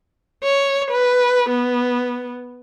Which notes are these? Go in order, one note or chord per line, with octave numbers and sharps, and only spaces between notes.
C#5
B4
B3